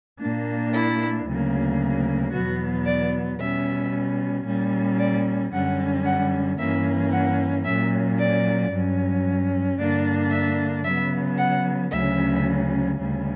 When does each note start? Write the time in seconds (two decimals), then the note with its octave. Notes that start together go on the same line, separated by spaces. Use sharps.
0.19 A#2 A#3 D4
0.72 E4
1.25 D2 C#3 F#3 A#3
2.31 E2 B2 F#3 B3 F#4
2.85 D5
3.38 B2 G3 C#4 E5
4.45 A#2 G3 C#4
4.98 D5
5.51 F#2 D3 G3 C#4 F#5
6.04 F#5
6.57 G2 E3 A#3 C#4 E5
7.11 F#5
7.64 A#2 F#3 C#4 E5
8.18 D5
8.71 G2 F#3 C#4
9.77 G2 D3 A#3 D4 D5
10.30 E5
10.83 C#3 F#3 B3 E5
11.37 F#5
11.90 D2 C#3 F#3 C#4 E5
12.96 D2 C#3 G3 C#4